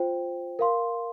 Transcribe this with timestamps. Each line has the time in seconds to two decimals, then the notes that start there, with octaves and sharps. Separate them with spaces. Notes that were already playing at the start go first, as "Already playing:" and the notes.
Already playing: F4 C5 G5
0.59 A#4 F5 C6